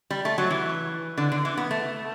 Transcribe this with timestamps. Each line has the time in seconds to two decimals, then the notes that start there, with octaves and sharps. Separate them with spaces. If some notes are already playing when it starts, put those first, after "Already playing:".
0.11 G3
0.25 A3
0.38 F#3
0.50 E3
1.18 D3
1.32 D3
1.45 E3
1.57 B3
1.71 A3